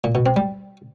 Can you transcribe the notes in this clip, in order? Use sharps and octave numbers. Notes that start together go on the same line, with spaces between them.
A#2
B2
C4
G3